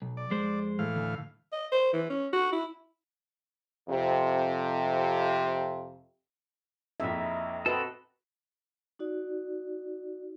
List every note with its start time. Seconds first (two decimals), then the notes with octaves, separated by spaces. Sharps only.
0.02 B1
0.17 D5
0.31 F2 G#3 C5
0.79 A2 E3 F5
0.96 D2
1.52 D#5
1.72 C5
1.93 E3
2.10 C#4
2.33 F#4
2.53 E4
3.89 F2 C3
7.00 A#1 F2 D#4 E4 E5
7.66 C4 F#4 A4 B4 D#5
8.99 D#4 F#4 D5